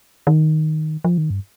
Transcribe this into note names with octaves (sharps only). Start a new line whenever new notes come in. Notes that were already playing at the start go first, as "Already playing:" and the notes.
D#3
F3
D#3
G2